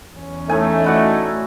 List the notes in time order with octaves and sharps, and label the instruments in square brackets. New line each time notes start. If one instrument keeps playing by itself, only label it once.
[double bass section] E2 C#4
[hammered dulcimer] A2 G#5 [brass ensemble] A3 D#4
[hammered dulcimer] E4 F#4 D5